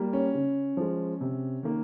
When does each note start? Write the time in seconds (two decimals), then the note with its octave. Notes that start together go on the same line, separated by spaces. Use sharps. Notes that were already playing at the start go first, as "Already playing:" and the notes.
Already playing: G3 A#3
0.13 C#4
0.34 C#3
0.77 F3 G#3
1.21 C3
1.63 D#3 A#3